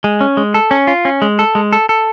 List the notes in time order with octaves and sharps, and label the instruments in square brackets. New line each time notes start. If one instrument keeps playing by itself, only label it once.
[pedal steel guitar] G#3
C#4
G#3
A4
C#4
F4
C#4
G#3
A4
G#3
A4
A4